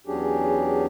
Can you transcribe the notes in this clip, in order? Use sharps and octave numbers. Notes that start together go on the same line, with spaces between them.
E2 F#3 C#4 D4 G4 G#4